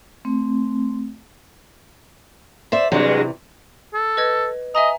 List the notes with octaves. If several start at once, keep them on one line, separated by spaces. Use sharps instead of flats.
A3 C4
C5 D5 E5
G2 C3 E3 F#3 G#3
A4
B4 D#5 G#6
D#5 E5 G#5 A#5